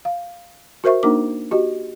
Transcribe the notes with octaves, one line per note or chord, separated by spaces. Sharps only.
F5
F#4 A#4 C5 E5 C#6
A#3 D4 D#4 A#4 D6
F#4 G4 D#5